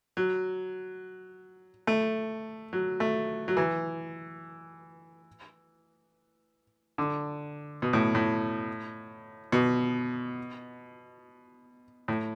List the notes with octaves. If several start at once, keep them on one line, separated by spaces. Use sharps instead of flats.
F#3
A3
F#3
A3
F#3
E3
D3
B2
A2
A2
B2
A2